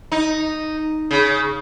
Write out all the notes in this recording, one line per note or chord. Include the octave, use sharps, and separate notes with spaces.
D#4
C#3